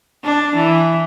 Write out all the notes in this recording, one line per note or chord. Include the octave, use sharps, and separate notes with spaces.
D4
E3